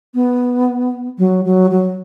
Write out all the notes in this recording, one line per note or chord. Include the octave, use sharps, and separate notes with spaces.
B3
F#3
F#3
F#3